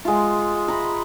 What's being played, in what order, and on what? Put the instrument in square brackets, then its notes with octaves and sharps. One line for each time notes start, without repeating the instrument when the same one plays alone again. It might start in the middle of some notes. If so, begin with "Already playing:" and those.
[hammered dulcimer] G#3 F4
A#5 B5